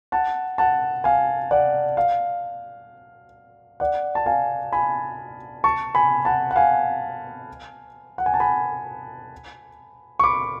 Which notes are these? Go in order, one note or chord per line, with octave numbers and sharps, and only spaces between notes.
F#5 A5
F#5 A5
F5 G#5
D5 F#5
F5
D5 F#5
A5
F5 G#5
G#5 B5
A5 C#6
G#5 B5
F#5 A5
F#5
F5 G#5
F#5
G#5
A5
G#5 B5
C#6
B5 D6